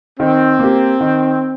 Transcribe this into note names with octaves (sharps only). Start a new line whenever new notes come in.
D#3 C4
A#3 G4
D#3